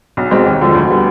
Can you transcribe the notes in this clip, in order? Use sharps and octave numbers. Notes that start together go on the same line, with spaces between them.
B1
B2 G#3 C4 D#4
D#2
D3 F3 G#3
D2
D3 G3 B3